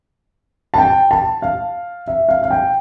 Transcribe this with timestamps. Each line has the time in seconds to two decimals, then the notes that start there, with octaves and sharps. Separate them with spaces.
0.74 A5
0.78 G5
1.11 A5
1.42 F5
2.08 E5
2.29 F5
2.43 F5
2.51 G5